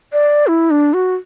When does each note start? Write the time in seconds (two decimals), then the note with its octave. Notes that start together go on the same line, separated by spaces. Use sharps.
0.12 D5
0.47 E4
0.71 D4
0.94 F#4